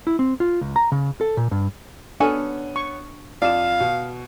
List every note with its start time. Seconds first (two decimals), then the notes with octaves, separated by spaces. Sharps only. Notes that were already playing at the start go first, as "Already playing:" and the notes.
0.07 E4
0.19 C4
0.40 F4
0.61 C#2
0.76 A#5
0.92 C#3
1.21 A4
1.37 A#2
1.51 G2
2.20 B3 C#4 D4 F#4 A4 G#5 F6
2.76 C#6
3.42 F2 F4 D5 F5 E7
3.80 B2